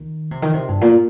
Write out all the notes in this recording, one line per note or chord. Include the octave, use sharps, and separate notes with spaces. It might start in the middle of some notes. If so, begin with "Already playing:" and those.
Already playing: D#3
C3
D#3
C3
G2
A#2